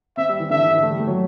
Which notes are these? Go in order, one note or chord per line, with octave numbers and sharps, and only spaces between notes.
C4 E5
G3
E3
D3 E5
D3
E3
A3
G3
A3
F#3